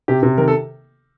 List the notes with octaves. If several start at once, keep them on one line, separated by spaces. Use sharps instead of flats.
C3 G4
C3
D#3 A#4
A4